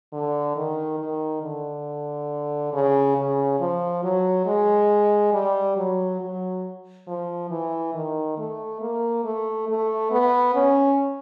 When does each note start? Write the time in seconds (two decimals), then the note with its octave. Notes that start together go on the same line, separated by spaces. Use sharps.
0.13 D3
0.56 D#3
0.99 D#3
1.43 D3
2.73 C#3
3.16 C#3
3.60 F3
4.03 F#3
4.46 G#3
5.33 G3
5.77 F#3
6.20 F#3
7.07 F3
7.50 E3
7.94 D#3
8.38 A3
8.81 A#3
9.24 A3
9.68 A3
10.11 B3
10.55 C#4